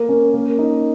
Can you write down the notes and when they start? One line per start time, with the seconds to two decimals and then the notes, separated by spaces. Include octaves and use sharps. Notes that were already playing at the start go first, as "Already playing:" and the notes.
Already playing: A#3
0.09 C#4
0.34 A#3
0.59 D#4